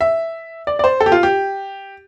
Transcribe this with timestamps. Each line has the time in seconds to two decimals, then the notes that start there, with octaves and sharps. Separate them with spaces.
0.01 E5
0.67 D5
0.79 D5
0.84 C5
1.00 A4
1.06 G4
1.12 F4
1.23 G4